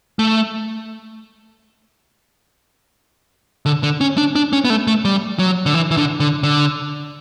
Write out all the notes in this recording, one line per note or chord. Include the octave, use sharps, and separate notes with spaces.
A3
D3
D3
C#4
D4
D4
C#4
B3
A3
A3
G3
F#3
D3
E3
E3
D3
D3
D3